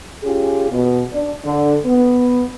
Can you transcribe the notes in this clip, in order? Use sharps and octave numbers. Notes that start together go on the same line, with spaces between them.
C#4 F4 G4 G#4
B2
D4
D3
B3